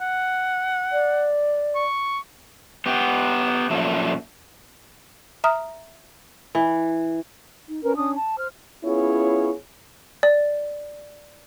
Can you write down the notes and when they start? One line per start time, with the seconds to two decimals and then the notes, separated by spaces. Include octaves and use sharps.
0.01 F#5
0.92 D5
1.75 C#6
2.86 B3 G4
3.70 F#2 A#2 F3 A3
5.44 E5 A#5 D#6 F6
6.55 E3
7.69 D#4
7.83 C#4 A#4 B4
7.96 C#4 D4 D#6
8.15 A5
8.37 C5 F6
8.84 B3 C#4 E4 F4 G#4 C#5
10.23 D5